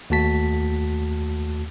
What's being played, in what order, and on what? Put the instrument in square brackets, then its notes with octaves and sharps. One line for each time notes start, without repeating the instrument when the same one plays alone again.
[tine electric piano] D#2 A3 F#4 A5 B6